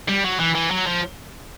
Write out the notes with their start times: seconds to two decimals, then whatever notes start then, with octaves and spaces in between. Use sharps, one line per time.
0.08 G3
0.24 F#3
0.39 E3
0.55 E3
0.71 F#3
0.87 F3